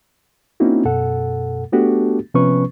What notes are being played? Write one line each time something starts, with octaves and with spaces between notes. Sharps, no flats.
A#3 C4 C#4 D#4 E4 F#4
F#2 B2 A4 F#5
A3 B3 D4 F#4 G4 A4
C3 F3 B3 C#4 B4 C#6